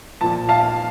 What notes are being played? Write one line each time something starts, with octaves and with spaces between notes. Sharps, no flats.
A#2 F3 A5
F5 A5